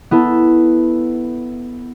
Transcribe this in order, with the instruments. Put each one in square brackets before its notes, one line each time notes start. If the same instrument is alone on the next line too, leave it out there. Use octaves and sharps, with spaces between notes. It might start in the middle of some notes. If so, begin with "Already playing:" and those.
[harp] B3 E4 A4